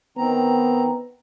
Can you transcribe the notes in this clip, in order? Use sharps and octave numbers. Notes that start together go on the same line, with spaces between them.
D#3 B3 C4 A#5